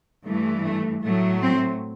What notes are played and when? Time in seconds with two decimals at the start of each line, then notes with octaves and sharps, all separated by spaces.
0.24 G2 E3 A3
0.63 A3
1.03 A2 F#3 A3
1.42 C4